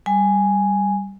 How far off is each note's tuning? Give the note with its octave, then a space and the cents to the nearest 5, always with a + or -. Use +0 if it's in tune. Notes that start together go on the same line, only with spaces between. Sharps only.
G3 +0 G#5 +0